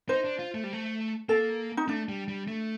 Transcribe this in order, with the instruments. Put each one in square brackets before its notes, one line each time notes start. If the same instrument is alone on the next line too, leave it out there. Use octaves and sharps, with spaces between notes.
[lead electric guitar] D#4 [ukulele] C5
[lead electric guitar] D4
F4
A3
G3
A3
[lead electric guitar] A#3 [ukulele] A4
[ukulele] D#4
[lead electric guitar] A3 [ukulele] D4
[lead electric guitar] G3
G3
A3